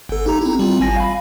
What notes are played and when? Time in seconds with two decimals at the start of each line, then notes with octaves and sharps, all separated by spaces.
0.09 G1 A4
0.26 D#4 G4 A#5
0.42 C4 E4
0.59 G3 C4 F4
0.80 G#1 G#5 A#6
0.96 F5 B5